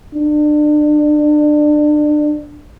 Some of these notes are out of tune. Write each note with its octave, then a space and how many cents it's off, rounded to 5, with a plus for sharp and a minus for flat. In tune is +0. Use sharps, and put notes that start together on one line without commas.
D4 +30